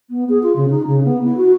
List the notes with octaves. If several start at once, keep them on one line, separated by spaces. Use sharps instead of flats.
B3
G#4
F4
C#3
D#4
C#3
B3
E4
F#4